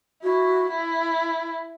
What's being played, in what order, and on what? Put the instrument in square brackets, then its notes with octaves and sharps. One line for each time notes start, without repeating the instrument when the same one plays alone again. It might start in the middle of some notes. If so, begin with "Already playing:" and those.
[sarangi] E4 [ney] F#4
[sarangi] E4